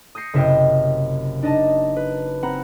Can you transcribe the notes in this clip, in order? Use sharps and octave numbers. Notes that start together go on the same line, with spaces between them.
D#6 G6 A#6 C7 C#7
F#1 C3 E4 D#5 F5 G5
D4 D#4 D#5 A5
B4
C4 F#5 A#5 B5